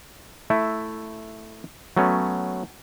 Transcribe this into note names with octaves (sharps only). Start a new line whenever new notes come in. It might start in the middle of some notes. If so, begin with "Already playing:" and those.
A3 E4 E5
F#3 A3 B3 C#4